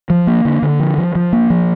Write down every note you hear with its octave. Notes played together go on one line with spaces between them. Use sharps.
F3
A#3
D3
D3
F3
F3
F3
A#3
F3